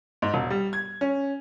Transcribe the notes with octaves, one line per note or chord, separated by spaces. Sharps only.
G#2
E1
G3
G#6
C#4